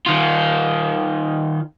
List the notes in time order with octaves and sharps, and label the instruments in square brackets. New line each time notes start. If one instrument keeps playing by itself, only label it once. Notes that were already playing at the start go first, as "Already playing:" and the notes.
[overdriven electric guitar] D#3 F4